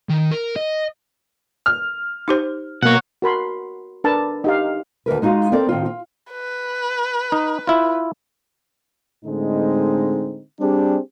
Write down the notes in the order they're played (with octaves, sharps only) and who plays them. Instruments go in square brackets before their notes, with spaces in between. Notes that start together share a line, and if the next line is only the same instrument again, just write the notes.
[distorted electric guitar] D#3
A#4
D#5
[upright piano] F6
[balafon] D#4 G4 C5
[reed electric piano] B2 A#3 [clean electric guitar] C#5 F#5
[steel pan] F#4 A#4 B5 C6
D4 A#4 B4 A5
D#4 G4 F5
[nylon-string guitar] D2 E3 A#4 B4
G#3 D#4 F4 F#4 F5
C4 A4 A#4 D5
A2 D#3 C4 F4
F4
[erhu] B4
[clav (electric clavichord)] D#4
E4 F4
[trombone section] A2 D3 G#3 C4 D#4
G3 C4 D4 G4 G#4